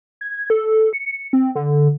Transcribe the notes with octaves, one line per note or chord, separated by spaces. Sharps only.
G#6
A4
C#7
C4
D3